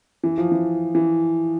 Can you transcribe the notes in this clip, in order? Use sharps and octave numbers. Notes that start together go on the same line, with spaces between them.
E3
F3
E3
E3